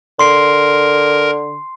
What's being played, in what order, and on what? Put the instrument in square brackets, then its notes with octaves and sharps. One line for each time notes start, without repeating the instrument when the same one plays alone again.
[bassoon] D3 [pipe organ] A#4 [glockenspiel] C6 C7